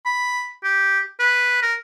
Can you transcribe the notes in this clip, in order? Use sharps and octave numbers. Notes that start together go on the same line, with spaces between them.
B5
G4
B4
A#4